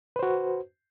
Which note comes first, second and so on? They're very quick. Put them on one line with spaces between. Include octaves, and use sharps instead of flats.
B4 C5 F#4